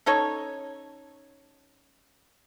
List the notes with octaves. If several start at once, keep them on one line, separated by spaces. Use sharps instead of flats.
C#4 D#4 A4 C#5